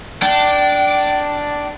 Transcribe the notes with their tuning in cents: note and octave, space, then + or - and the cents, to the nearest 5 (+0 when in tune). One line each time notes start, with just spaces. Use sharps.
D4 +0 G5 -30